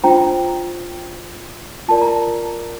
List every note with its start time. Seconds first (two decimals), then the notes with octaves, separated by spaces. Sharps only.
0.04 D4 F4 C5 G5 A#5
1.88 F4 A#4 D5 A5
2.02 A#5